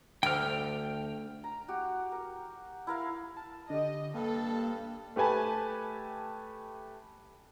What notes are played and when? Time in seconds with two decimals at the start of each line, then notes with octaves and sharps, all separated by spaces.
0.23 D2 G5 F6
1.44 A#5
1.68 F#4 G4
2.12 A#4
2.87 E4 A#4 F5
3.37 A5
3.70 D3 D4 G4 D#5
4.14 G2 A#3 A4
5.16 A3 G4 B4 G#5 A5